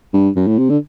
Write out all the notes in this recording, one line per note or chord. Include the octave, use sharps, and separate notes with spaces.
G2
F#2
A2
C3
D3